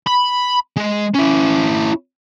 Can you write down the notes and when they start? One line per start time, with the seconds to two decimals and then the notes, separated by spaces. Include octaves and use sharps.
0.07 B5
0.76 G#3
1.14 C#4 E4